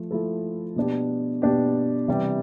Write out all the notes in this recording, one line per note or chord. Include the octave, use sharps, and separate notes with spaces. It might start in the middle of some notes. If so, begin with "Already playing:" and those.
Already playing: F3 A3
F3 A3 E4 A4
B2 B3 D4 G4
B2 B3 D4 G4
C3 E3 G3